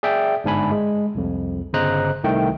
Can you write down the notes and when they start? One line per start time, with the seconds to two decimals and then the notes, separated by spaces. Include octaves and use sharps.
0.03 G#4 D5 E5 G5
0.44 G1 G#2 D4 G#5 B5
0.71 G#3
1.15 C2 F2
1.74 G1 C#3 C5 D#5 A#5 F#6
2.24 C2 D#3 A3 G5